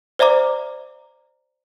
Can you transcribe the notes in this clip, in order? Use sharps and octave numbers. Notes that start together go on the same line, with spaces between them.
C5 D5 E5 A#5 D6